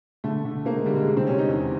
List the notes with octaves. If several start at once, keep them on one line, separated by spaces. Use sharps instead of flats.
D3 A3
D3
D3 A#3
G#3
D3 G3
G#3
C3
C4
C3 C#4
D#4
E2